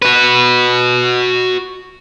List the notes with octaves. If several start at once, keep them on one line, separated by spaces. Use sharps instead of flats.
F#4 B4